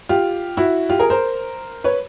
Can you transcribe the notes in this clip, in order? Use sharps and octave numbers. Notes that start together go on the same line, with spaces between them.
F4 G4
E4 F#4
F4 G4
G#4 A#4
A#4 C5
B4 C#5